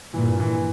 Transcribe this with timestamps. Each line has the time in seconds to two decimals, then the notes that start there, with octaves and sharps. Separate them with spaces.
0.14 G2 A#2 E3
0.40 E3